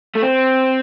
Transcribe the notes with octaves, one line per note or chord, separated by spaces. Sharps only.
A3
C4